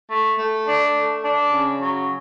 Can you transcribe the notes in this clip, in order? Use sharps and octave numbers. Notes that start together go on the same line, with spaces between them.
A3
A3
D4
A3
D4
C#3
F#3